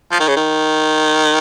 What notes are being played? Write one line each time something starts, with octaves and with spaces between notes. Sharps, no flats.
F3
D#3
C#3
D#3